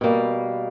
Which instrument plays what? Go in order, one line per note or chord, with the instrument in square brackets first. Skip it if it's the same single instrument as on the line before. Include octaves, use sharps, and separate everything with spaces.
[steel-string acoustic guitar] B2 G3 A#3